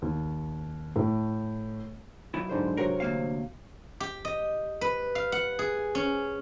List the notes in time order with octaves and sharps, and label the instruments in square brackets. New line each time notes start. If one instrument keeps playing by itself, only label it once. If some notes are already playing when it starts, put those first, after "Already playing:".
[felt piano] D#2
A2
[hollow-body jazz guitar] B1 F#2 E4
[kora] G#2 D3 C5
[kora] C3 F#3 F#5 [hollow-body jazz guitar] A#4
[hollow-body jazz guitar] D2 A#3 F5
[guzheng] G4
D#5
B4
F5
F#5
G#4
C#4